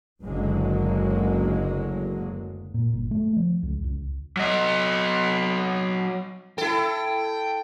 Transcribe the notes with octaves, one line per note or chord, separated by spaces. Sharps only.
F#1 D2 D3 F#3 G#3 A#3
A#2
G1
A3
F3
C#2
C#2
F#3 D#5
E4 A4 G5